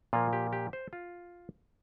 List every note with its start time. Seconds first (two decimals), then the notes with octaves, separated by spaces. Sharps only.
0.13 A#2 F3 A#3 F4
0.33 G4
0.53 G4
0.73 C5
0.93 F4